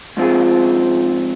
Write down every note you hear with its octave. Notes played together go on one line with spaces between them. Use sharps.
G#2 F3 C4 F4 G#4